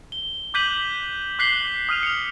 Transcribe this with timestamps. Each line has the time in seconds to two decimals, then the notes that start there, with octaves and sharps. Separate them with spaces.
0.12 G7
0.54 D6 F#6 G6 B6 D#7 F#7
1.39 D6 F#6 B6 C7 F#7 G7
1.89 D#6 F6 D#7 F7
2.03 C#7 F7